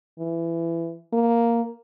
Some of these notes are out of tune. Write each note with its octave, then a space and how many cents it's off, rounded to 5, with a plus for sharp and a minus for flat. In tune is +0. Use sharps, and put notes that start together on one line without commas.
E3 +20
A#3 +0